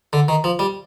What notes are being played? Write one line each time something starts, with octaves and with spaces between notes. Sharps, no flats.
D3
D#3
F3
G3